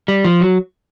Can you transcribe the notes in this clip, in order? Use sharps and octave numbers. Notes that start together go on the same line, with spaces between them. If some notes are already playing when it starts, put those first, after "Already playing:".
G3
F3
F#3